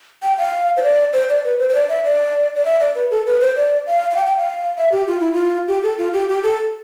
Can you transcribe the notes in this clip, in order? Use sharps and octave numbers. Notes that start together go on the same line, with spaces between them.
G5
F5
C5
D5
C5
D5
B4
C5
C5
D5
E5
D5
D5
E5
D5
B4
A4
B4
C5
D5
F5
F5
G5
G5
F5
E5
G4
F4
E4
F4
G4
A4
F4
G4
G4
A4